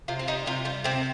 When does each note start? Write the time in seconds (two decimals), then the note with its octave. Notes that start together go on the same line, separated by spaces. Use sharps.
0.08 C3 F4
0.19 C4
0.27 G3 D#4
0.46 C3 F4
0.65 G3 F4
0.84 C3 C4